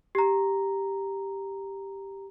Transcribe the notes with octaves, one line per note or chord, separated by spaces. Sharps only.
G4 A#5